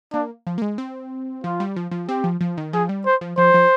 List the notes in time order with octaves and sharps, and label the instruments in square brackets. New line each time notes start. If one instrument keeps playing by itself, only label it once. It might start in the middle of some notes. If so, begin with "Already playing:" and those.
[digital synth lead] A#3 [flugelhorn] D4
[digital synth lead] F3
A#3
G#3
C4
[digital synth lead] F3 [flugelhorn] F4
[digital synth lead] G3
F3
F3
[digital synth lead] C4 [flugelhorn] G4
[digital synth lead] F3
F3
D#3
[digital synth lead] F3 [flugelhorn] G#4
[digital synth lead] G3
[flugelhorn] C5
[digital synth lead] F3
[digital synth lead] F3 [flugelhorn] C5
[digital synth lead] F3